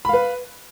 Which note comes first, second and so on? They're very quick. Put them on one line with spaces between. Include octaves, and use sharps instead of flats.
B5 F5 B4